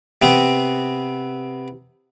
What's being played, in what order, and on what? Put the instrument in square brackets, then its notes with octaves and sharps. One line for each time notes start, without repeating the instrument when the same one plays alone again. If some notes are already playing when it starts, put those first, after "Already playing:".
[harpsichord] C3 B3 C4